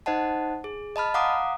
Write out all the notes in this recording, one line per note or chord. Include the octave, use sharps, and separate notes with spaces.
D#4 C5 D#5 F#5 A5
G#4
D#5 A5 B5 F6
F5 F#5 A#5 D6 D#6